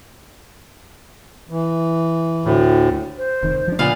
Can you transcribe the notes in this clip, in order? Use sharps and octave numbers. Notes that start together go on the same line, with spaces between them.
E3
D2 A2
C5
F1 D#3
F3 D4
A#2 C#3 A#3 B3 F4 F5